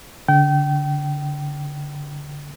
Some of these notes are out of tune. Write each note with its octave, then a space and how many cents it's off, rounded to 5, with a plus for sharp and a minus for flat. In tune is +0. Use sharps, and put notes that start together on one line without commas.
D3 -25 G5 -30